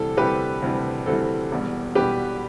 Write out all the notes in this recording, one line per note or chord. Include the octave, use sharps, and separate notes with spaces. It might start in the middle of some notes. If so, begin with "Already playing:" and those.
Already playing: D2 C3 E3 G3 A4
D2 C3 E3 G3 G4 B4
D2 C3 E3 G3
D2 C3 E3 G3 A4
E1 E2 B2 G3
E1 E2 B2 G3 G4 B4